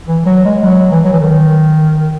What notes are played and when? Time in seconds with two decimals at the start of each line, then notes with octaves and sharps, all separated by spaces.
0.07 E3
0.26 F#3
0.45 G#3
0.63 F#3
0.92 E3
1.05 F#3
1.12 E3
1.20 D#3